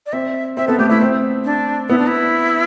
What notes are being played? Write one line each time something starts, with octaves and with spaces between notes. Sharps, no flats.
D5
C4 E5
C4 E5
B3 A4
A3 G4
A3 E4
C4
D4
B3 E4
D4
E4